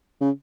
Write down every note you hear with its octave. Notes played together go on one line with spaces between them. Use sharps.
C#3